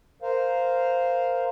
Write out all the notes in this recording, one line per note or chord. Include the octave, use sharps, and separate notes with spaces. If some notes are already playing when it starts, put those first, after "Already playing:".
A#4 C5 F5